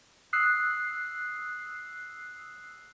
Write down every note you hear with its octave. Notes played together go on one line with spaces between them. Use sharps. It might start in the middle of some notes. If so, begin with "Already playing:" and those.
D#6 E6 F#6 C7